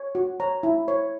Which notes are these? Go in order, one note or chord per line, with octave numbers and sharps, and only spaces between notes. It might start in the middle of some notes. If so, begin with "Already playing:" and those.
Already playing: C#5
F#4
C#5 A#5
E4
C#5